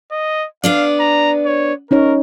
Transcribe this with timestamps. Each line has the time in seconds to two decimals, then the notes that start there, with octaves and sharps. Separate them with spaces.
0.12 D#5
0.64 B3 D4 D5 F5
1.00 A#5
1.46 C#5
1.91 C#4 D#4 A#4 C#5